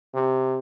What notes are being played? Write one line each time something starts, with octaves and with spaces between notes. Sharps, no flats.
C3